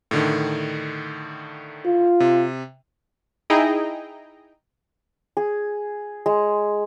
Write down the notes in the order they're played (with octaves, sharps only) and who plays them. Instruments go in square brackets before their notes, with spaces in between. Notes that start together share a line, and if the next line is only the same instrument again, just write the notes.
[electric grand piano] A2 D3 D#3
[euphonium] F4
[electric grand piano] C3
[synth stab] D#4 E4 G#4 D#5 G5 A#5
[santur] G#4
G#3